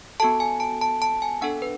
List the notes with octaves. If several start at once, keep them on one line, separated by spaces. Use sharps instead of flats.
B3 F#4 A4 A5
G#5
A5
A5
A5
G#5
B3 D4 A4 F#5
B4